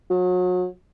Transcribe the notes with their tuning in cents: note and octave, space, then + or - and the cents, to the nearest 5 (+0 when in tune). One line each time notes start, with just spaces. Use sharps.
F#3 -35